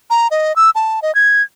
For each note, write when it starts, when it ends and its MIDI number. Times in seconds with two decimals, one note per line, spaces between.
0.10 0.28 82
0.31 0.55 75
0.56 0.70 88
0.75 1.00 81
1.02 1.14 75
1.15 1.42 92